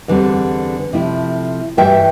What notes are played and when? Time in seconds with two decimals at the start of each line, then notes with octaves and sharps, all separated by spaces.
0.08 E2 D3 G3 C4
0.93 C3 F3 A3 E4
1.77 G2 E3 A3 E5 G5